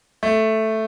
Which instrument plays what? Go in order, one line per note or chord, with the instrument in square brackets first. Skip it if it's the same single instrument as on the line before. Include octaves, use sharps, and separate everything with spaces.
[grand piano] A3